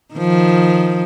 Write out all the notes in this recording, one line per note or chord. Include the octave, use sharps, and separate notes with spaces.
D#3 F3